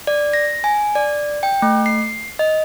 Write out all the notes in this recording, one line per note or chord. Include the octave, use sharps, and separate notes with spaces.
D5
A#6
G#5
D5
G5
A3
C7
D#5